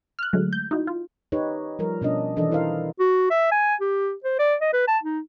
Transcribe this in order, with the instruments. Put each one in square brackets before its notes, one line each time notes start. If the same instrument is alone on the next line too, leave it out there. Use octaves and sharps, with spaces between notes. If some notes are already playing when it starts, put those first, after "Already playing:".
[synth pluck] F6 F#6
D3 F#3 G#3 A3
G6
D#4 E4 F#4
F4
[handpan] D#4 G4 B4 C#5
F3 G3 A#4
B2 C#4 D4 D#5
D#3 E3 D4 A4 D#5
E4 A#4 C5 F5
[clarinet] F#4
E5
G#5
G4
C5
D5
D#5
B4
A5
D#4